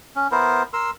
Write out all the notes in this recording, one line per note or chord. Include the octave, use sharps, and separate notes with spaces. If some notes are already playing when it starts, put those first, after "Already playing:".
C#4
B3 E4 A#4 C5
A#4 C6 E6